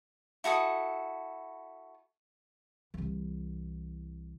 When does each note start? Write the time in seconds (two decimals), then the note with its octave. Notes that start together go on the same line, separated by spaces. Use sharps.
0.44 E4 F#4 A4 D#6
2.94 C2 E3